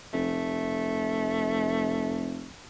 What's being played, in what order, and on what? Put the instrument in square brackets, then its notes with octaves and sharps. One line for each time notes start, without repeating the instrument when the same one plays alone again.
[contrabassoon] F1 [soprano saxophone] A3